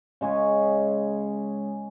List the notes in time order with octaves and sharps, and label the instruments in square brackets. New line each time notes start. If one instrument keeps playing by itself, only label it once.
[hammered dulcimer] C#3 G#3 C#4 G#4